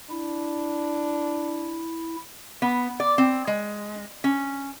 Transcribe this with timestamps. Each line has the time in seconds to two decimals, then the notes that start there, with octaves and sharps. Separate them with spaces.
0.10 D4 E4
2.62 B3
3.00 D5
3.18 C4
3.47 G#3
4.24 C#4